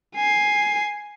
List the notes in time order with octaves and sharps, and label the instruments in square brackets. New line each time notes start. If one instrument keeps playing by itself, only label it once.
[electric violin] G#5 C7